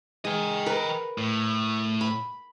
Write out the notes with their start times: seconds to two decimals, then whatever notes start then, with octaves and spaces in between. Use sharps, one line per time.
0.25 G#3 D#5 G5
0.66 A#4 B4
1.18 A2
2.01 B5